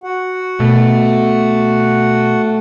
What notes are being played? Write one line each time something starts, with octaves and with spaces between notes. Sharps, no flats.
F#4 F#5
B2 A3